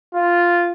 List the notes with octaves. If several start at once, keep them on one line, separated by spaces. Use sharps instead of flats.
F4